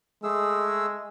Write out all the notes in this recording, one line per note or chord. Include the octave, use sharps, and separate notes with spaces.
G#3 A3 G#4 E6